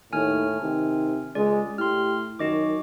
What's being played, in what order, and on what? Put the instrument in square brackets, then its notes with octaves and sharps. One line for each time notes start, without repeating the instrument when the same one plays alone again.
[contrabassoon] D#2 [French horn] A2 [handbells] G#5 F6
[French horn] C3 [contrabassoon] D#3
[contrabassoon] C#2 [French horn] G#3 [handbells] D5
[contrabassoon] A2 [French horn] G4 [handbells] C6 F6
[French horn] F#2 [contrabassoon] D#3 [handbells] F#4 D#5 D6